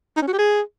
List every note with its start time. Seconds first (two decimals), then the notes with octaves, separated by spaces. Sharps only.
0.16 D#4
0.22 C#4
0.27 F#4
0.33 G4
0.38 G#4